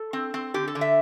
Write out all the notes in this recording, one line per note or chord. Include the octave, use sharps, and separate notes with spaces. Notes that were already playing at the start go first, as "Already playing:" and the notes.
Already playing: A4
C4
C4
D3 G4
A4
D3
E5